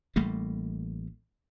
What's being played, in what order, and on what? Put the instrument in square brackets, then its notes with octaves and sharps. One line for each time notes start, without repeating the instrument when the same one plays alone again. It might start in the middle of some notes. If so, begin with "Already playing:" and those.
[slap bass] A1 G3 A3 A#3